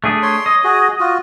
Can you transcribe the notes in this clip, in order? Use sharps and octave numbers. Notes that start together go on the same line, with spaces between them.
A3 D4 G#4
C#5 C6
D#5
F#4 G#4
F4 F#4